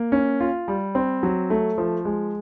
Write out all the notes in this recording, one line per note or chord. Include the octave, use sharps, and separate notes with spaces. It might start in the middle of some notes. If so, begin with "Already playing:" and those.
Already playing: A#3
C#4
F4
G3
C4
F#3
A3
F3
G#3